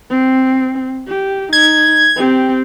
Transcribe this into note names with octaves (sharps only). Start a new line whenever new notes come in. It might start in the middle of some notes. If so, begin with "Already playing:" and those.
C4
G4
D#4 G#6
C4 G4